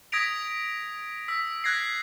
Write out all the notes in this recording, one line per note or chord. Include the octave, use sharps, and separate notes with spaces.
D#6 G#6 A#6 B6 D7 F7
E6 B6
F#6 G#6 A#6 C7